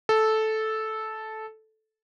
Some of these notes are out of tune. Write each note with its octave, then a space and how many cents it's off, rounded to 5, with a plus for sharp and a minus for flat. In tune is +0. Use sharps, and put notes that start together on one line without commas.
A4 -10